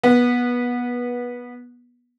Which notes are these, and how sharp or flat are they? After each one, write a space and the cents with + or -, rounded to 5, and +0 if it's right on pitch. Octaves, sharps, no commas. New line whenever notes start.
B3 -20